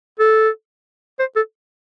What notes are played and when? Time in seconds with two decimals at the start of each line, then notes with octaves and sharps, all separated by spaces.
0.19 A4
1.20 C5
1.36 A4